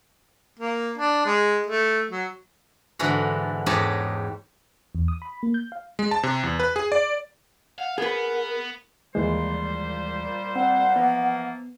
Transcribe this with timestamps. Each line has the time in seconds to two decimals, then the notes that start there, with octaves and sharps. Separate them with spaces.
0.59 A#3
0.98 D4
1.26 G#3
1.66 A3
2.11 F#3
2.99 G#2 D3 E3 F#4
3.66 E2 G#2 D#4 G4 C#5 A5
4.95 E2
5.08 D#6
5.22 B5
5.43 A#3
5.54 G6
5.72 F5
5.99 G#3
6.11 A5
6.23 C3
6.43 E2
6.60 B4
6.76 G#4
6.92 D5
7.78 F5 F#5
7.98 B3 G#4 A#4 B4
9.15 D#2 A#2 E3 G3 G#3 C5
10.56 C4 F#5
10.96 E3 F3 A#3 B3